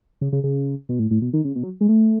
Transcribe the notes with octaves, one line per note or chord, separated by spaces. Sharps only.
C#3
C#3
C#3
B2
A2
A2
B2
D#3
C#3
B2
F#3
G#3
A3